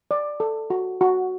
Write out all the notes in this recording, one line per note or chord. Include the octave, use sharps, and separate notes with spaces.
D5
A4
F#4
F#4